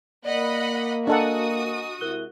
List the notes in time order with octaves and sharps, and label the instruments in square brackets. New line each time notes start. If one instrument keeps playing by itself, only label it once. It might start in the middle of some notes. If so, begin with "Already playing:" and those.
[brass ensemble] A#3 [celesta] D5 [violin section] D#5 F#5 B5
[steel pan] D4 A4 F#5 [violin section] F#4 D#6 [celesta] D#5 G#5 A#5
[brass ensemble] C3 G#3 E4 [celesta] A#4 F#6 G7